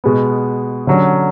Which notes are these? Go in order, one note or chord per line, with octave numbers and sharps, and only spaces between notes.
B2 G#3 B3
D3 F#3 C#4